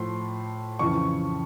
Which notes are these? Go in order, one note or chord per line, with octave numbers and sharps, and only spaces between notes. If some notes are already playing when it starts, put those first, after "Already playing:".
Already playing: A2 F3 C6
F2 C#3 E3 C#6